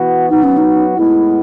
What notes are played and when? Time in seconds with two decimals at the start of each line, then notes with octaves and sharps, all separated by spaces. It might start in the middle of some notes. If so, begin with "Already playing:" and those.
Already playing: E3 B3 F#4
0.30 F#3 B3 D#4 F#4
0.43 C#4
0.57 D#4
0.97 A2 G#3 B3 E4